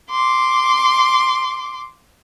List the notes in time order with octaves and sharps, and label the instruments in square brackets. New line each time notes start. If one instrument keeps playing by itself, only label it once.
[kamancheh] C6 D6